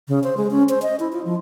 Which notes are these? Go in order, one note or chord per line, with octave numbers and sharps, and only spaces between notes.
C#3
C5
G#3
C#4
C5
D#5
E4
F4
F3